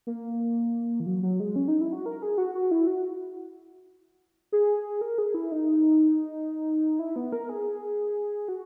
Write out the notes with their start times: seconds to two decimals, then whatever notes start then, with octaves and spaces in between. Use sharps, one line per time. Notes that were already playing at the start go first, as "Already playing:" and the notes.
0.07 A#3
1.00 E3
1.06 F#3
1.23 F#3
1.40 G#3
1.56 C#4
1.68 D#4
1.81 E4
1.93 F#4
2.06 A#4
2.22 G#4
2.38 F#4
2.55 F#4
2.71 E4
2.87 F#4
4.52 G#4
5.01 A#4
5.18 G#4
5.34 E4
5.52 D#4
6.99 E4
7.16 B3
7.33 A#4
7.49 G#4
8.48 F#4